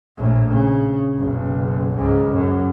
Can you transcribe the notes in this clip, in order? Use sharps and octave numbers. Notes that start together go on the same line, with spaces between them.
A#1 A2
C#3
F#1 B1
C#2 G#2
F#2